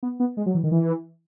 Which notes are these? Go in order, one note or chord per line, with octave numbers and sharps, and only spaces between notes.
B3
B3
G#3
F#3
E3
D#3
E3